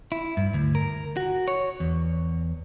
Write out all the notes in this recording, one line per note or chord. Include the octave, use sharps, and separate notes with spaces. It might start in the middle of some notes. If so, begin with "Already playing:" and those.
E4
G2
D2
A#4
F#4
C#5
E2